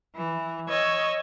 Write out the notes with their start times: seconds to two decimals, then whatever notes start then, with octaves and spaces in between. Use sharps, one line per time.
0.16 E3
0.69 C#5 D#5 E6 G#6